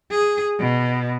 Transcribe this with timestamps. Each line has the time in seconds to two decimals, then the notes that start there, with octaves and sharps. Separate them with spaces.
0.11 G#4
0.60 B2